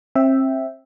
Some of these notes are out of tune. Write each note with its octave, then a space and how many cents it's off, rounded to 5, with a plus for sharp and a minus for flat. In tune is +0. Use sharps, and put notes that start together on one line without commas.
C4 +35 E5 +0 G5 -5